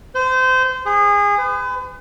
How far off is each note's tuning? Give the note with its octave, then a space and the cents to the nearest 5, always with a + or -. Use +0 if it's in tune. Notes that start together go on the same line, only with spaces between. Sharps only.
C5 -25
G#4 -25
B4 +40